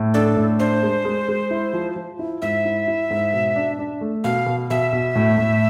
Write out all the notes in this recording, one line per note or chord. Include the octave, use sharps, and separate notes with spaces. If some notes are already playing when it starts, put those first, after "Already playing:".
Already playing: A2
D4 A4
A2
D4 C5
G#3
G#3
G#3
E4
F3
F3
E4
G#2 E5
E4
E4
G#2
B2
D4
D4
A3
B2 F5
B2
B2 E5
B2
A2
A2